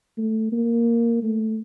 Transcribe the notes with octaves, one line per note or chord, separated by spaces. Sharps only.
A3
A#3
A3